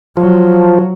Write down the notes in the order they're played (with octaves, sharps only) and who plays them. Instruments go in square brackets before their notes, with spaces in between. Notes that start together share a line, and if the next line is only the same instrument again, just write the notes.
[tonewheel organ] F3 [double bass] F#3